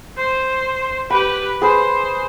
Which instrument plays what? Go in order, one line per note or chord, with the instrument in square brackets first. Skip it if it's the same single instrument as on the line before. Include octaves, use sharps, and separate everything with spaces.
[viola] C5
[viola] G4 B4 [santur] B5
[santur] G#4 B4 [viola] C5